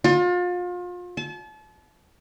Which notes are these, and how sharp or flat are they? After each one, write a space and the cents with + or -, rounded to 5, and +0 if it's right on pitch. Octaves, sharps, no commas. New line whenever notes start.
F4 +35
A5 -35